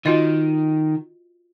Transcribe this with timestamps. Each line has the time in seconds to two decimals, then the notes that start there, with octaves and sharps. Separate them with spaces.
0.06 D#3 F4 F#4 D#5